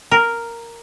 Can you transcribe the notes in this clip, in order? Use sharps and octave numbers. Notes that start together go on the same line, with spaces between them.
A#4